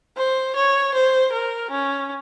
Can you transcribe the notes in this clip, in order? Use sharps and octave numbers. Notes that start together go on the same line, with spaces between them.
C5
C#5
C5
A#4
C#4